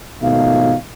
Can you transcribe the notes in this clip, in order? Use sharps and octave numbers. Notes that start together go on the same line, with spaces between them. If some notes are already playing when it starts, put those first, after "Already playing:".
G#1 B2 F3 A3 D#4 F5